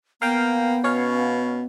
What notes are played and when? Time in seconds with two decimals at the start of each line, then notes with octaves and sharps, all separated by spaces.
0.22 A#3 B3 F5 G5
0.84 B2 C#4 C#5 F5